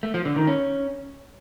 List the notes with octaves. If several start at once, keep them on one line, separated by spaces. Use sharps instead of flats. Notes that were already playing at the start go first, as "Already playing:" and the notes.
A3
F3
D3
D#3
C#4